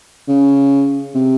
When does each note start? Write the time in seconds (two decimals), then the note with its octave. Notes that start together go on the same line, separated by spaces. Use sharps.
0.28 C#3
1.15 C3